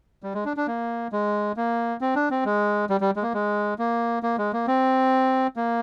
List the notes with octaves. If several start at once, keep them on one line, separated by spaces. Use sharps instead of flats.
G3
G#3
D4
D4
A#3
G#3
A#3
C4
D4
C4
G#3
G3
G3
G#3
A#3
G#3
A#3
A#3
G#3
A#3
C4
A#3